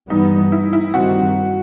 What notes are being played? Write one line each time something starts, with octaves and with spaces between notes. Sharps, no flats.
G2 E3 G3 B3 D#4
E4
E4
G2 D#3 G3 C4 F#4